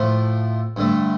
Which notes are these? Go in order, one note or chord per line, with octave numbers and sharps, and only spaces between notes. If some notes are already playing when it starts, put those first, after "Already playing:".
Already playing: A2 F3 A3
G2 D3 A3